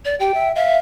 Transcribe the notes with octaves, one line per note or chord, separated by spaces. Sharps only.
D5
G4 G5
E5
E5 F5